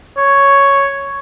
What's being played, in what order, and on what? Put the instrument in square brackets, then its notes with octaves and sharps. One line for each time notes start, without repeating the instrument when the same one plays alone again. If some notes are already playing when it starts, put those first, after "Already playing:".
[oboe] C#5